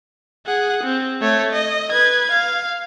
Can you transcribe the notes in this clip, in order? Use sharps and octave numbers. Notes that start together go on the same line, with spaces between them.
G#4 F#5
C4
A3 C#5
D#5
B4 G#6
F5